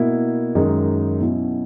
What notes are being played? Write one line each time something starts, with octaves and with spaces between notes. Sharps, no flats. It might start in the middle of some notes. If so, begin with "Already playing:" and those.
Already playing: B2 A#3 E4
F#2 D#3 G#3 D#4
B2 F#3 C#4 E4